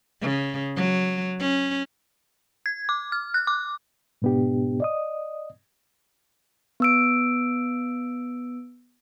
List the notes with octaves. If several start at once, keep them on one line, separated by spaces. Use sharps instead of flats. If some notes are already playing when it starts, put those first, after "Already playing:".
C#3
F#3
C#4
G#6
D6
F6
F#6
D6
G#2 B2 B3 D4 G4
D5 D#5 D#6
B3 E6 D7